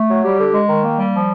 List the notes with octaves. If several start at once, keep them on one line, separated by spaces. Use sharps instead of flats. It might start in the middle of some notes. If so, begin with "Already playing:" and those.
Already playing: A3
F#3
G3 G4
D3
G#3
D#3
A#3
G3
F3